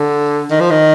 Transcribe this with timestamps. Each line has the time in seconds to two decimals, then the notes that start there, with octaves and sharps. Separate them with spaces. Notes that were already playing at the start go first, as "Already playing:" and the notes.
Already playing: D3
0.51 D#3
0.60 F3
0.70 D#3